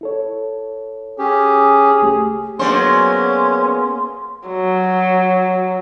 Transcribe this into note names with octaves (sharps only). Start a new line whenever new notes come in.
E4 A4 C#5
C#4 G4 G#4
C2 A3 G4
F#3 A#3 B3 C#4 D4 G#4 C5 C6
F#3